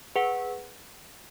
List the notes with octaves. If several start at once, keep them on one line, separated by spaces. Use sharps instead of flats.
G#4 B4 F#5